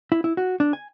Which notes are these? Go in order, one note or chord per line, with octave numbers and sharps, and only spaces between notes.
E4
E4
F#4
D4
G#5